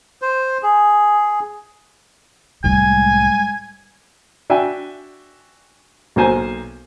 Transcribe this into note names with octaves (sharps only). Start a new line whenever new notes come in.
C5
G#4
C2 A2 G3 G#3 G#5
D4 F#4 E5 G5 G#5
B1 F#3 A#3 C5 G#5